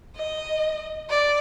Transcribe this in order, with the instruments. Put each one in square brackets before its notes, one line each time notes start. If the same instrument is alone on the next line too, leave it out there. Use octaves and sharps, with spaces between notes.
[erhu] D#5
D5